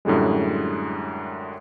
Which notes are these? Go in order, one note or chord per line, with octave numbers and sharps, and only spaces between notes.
F#2 A2 D3 G3 G#3